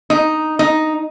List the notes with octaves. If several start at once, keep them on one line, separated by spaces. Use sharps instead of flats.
D#4
D#4